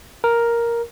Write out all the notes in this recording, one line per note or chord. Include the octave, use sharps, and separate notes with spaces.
A#4